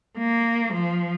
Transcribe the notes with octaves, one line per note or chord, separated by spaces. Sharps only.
A#3
F3